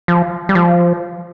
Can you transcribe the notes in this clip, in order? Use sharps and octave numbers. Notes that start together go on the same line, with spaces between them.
F3
G3
F3